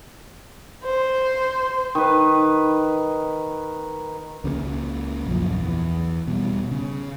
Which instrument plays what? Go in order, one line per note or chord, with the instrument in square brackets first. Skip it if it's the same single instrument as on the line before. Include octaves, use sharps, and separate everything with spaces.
[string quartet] C5
[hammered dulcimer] D#3 B4
[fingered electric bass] C#2 C#3 G3 A#3
A#1 F#2 F3
E2
B2 G3
C#3